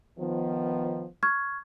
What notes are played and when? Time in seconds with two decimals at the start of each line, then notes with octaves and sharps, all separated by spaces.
0.19 D#3 F3 B3
1.23 C#6 F6 G#6